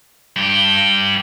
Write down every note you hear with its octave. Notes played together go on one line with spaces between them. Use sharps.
G2 G4